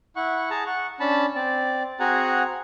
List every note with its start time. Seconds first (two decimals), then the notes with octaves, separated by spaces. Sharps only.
0.16 E4 F#5 C#6
0.50 G#4 A5 A#5
0.66 F#5 C#6
1.00 C#4 D4 A5 B5
1.35 C4 D5
2.00 C4 F#4 G#4 F#5 G#5 A#5